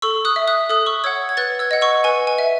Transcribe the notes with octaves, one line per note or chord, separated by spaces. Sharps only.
A4 C#6 E6
D#6 F#6
E5
D#6 F#6
A4 D#6 F#6
C#6 E6
C#5 F#5 E6 G#6
G#6
B4 F#6 A6
E6 G#6
D#5 F#5
C#6 E6
B4 G#5
G#5
E5